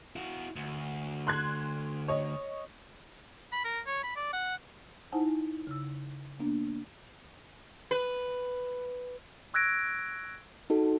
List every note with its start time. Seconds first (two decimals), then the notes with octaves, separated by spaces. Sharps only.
0.16 E4 F#4
0.56 D2
1.27 C6 F#6 G#6
2.08 C#5 D#5
3.52 B5
3.64 A#4
3.86 C#5
4.03 B5
4.16 D5
4.33 F#5
5.12 D#4 E4 C5 F#5 G#5 A5
5.67 C#3 E6
6.39 A#3 B3 D4
7.91 B4
9.54 C#6 E6 F#6 G#6 A#6 D7
10.70 D#4 F#4 A4